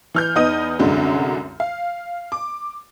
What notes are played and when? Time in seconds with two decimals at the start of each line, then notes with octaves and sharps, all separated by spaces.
0.15 E3 F6 G6
0.35 E2 B3 D#4 D#5 D#6 D#7
0.79 C2 F#2 D3 F#3 G#3
1.60 F5
2.32 D6